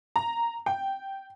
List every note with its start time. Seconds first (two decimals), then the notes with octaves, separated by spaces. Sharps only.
0.16 A#5
0.66 G5